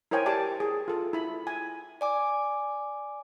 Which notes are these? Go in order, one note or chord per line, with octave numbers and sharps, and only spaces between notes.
E4 A#4 C5 C#5 G5 G#5
G4 D5 A5 D6
G#4
F4 A4
E4 B5
G#5
D5 G#5 D6